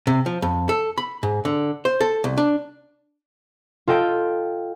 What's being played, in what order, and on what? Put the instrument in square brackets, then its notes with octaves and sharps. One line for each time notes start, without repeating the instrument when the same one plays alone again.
[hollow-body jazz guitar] C3
F3
F2
A4
B5
G#2
D3
C5
A4
C2
D4
[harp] F4 A4 D#5 G5